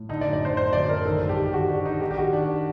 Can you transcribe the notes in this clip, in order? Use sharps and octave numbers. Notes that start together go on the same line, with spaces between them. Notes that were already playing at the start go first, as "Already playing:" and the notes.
Already playing: A2
D3 D#4
D5
F#2
D5
D3 C5
D3 C5
F#2 D5
D3 A#4
D#3 A4
G2
G4
D#3
G4
D#3 F#4
D#3 D4
D#3 D#4
D#3 G4
G4
D#3 F#4
D#3 D4